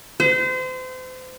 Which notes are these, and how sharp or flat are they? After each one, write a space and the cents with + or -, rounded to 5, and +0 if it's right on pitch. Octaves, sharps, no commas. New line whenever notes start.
C5 -35